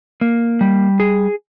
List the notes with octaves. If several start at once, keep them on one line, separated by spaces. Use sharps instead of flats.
A#3
G3
G#4